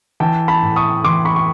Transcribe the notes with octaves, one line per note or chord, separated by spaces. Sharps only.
E3 G5 A5
A5 B5
A2
C#6 D#6
E3 C6 D6
B5 C#6
C#6